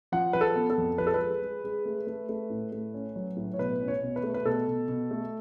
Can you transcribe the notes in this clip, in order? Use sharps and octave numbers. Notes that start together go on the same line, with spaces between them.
F3 F#5
F3 B4
A4
B3
A4
F2
F3 B4
A4
B4
G#3
G#3
G#3
A3
A3
A3
A2
A3
C#4
F#3
A2
C#5
B2 B4
C#4
C#5
B2
B4
A3
B4
B2 A4
B2
B2
A3